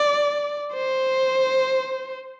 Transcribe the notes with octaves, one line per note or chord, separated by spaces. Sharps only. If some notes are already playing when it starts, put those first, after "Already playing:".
Already playing: D5
C5